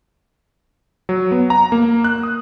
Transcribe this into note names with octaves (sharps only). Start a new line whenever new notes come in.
F#3
B3
A#5
A#3
F#6
D#6